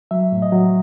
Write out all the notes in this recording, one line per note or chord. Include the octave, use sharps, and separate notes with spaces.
F#3 E5
A2
D#5
F#3